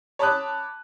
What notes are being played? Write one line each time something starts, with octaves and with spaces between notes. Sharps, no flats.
C#5 A5 B5 D6 D#6 F#6